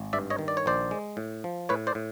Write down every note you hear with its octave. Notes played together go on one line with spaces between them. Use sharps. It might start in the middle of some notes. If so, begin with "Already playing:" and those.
Already playing: G#1
G2 D5 E5
C#5 D#5
D#3
D5
C#5
A#1 C5 D5
G#3
A2
F3
A2 B4 C#5
C5 D5
A2